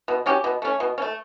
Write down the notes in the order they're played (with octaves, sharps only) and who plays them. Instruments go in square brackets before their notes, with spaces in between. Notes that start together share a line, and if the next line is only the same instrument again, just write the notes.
[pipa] B2
F#3 C#4 G4
B2
A3 C#4
B2
C#4
A3